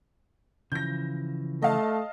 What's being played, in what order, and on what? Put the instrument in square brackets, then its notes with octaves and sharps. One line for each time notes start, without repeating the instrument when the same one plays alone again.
[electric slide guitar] C#3 E3 F3 [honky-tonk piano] G6 A#6
[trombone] A3 [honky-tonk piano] D#5 F5 A5